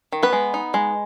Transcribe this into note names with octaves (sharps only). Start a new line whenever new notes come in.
D#3
B3 B4
G#3
D#4
G#3